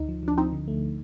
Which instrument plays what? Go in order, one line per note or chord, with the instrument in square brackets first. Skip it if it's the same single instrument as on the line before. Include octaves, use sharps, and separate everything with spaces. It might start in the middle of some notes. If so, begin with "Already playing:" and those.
Already playing: [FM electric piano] D2 D#4
F3
[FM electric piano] F3 [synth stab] D4
[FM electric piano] F3 [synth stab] C4 D#4
[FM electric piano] D3
A3